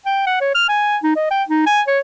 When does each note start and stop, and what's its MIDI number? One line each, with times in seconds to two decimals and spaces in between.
0.06 0.23 79
0.27 0.40 78
0.41 0.50 73
0.55 0.68 89
0.68 0.97 80
1.03 1.13 63
1.16 1.28 75
1.30 1.43 79
1.48 1.62 63
1.66 1.81 80
1.87 1.99 73